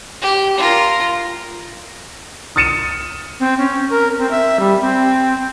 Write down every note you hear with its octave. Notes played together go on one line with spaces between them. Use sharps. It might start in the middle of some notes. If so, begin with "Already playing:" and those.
G4
F4 A#4
D#6 F6 A6 C#7 D#7 E7
C4
C#4
A#4
C4
E5
G3
C4